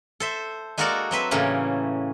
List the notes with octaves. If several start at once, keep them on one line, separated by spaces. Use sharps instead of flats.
A4 C5 E5
G#3 A#3 F#4 A4 A#4 D5
F#3 C4 B4 E5
A2 C#3 E3 A#3 C#4